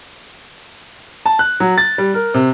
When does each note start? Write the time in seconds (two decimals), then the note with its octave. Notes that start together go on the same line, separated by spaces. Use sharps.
1.26 A5
1.39 F#6
1.60 F#3
1.78 A6
1.98 G3
2.14 A#4
2.34 C3